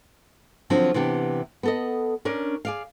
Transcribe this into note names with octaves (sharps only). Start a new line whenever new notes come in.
D3 F3 F#3 C4 D4
C3 E3 B3 D4 G4
B3 A4 D#5
C#4 D4 A#4
G#4 D5 F5